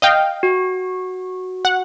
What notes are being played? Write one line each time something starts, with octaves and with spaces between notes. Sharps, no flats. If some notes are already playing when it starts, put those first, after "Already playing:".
D#5 F5 G5
F#4
F#5